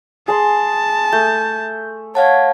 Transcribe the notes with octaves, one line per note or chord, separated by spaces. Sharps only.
G#4 A5 C6
A3 G6
C#5 F5 F#5 A5